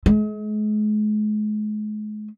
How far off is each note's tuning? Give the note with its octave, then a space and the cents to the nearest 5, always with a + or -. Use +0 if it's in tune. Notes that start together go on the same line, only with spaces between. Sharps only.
G#3 +40